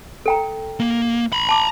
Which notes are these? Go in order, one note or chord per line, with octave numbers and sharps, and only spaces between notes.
A4 G5 A#5
A#3
A#5 B5
A5 D6